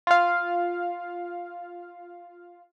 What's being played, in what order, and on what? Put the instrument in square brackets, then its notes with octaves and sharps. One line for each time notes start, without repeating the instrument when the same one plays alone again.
[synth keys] F4 F5